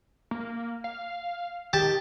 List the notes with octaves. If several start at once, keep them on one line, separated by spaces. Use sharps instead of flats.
A#3
F5
D#3 G4 A5